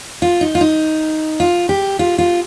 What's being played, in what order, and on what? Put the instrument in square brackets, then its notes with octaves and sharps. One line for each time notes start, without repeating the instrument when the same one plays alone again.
[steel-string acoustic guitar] F4
D#4
F4
D#4
F4
G4
F4
F4